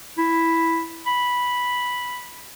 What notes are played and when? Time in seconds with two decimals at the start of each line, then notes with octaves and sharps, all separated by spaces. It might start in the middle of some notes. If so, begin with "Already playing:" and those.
0.18 E4
1.07 B5